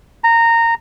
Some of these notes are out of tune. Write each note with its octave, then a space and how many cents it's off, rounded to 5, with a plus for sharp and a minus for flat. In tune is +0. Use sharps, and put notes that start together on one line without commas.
A#5 -15